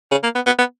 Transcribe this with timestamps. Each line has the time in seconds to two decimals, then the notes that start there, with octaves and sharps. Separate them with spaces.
0.11 C#3
0.23 A#3
0.35 B3
0.46 B3
0.58 B3